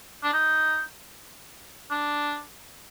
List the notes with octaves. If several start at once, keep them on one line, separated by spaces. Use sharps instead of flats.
D4
D#4
D4